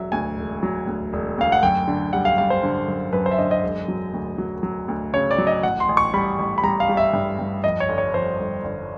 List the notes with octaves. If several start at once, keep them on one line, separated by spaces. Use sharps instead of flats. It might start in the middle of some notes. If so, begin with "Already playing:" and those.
Already playing: E1 F#3 E5
D2 G#5
E1
F#3
D2
E1
D2 F5
F#5
F#2 G5
D3
G3 F#5
F5
G3 F5
C5
D3
F#2
F#2 B4
C5
E5
D3 D#5
D#5
E1
F#3
D2
F#3
F#3
D2
C#3 C#5
D5
F#3
D#5
A1 F#5
C6
A1
C#6
G3 B5
A1
B5
G3 A#5
F5
G3
E5
G2
G2
F2 D#5
C#5
G1
C#5
F2 C5
G1
G1